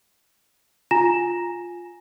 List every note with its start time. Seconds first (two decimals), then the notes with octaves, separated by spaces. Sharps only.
0.91 F4 G#5 A#5 A#6 E7